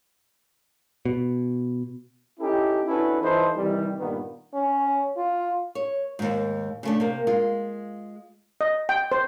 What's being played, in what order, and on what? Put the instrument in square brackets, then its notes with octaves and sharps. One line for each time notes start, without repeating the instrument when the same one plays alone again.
[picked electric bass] B2
[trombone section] C#4 D#4 E4 G4 A4
C#4 D4 E4 F#4 A4 B4
E3 D#4 F4 A4 B4 C5
C3 D#3 E3 G3
G2 A#2 D#3 A#3 B3
[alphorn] C#4
F4
[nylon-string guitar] C#5
D#2 G#2
C#3 A3 D4
C3 A#3
G#3 F4
[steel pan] D#5
G5
C5